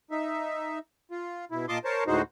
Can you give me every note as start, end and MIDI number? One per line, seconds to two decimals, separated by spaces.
0.11 0.79 63
0.11 0.79 76
1.11 1.45 65
1.51 1.66 47
1.51 1.66 64
1.69 1.78 46
1.69 1.78 65
1.69 1.78 75
1.69 1.78 81
1.69 1.78 84
1.69 1.78 86
1.84 2.04 70
1.84 2.04 72
1.84 2.04 73
1.84 2.04 81
2.07 2.22 38
2.07 2.22 45
2.07 2.22 56
2.07 2.22 63
2.07 2.22 66
2.07 2.22 72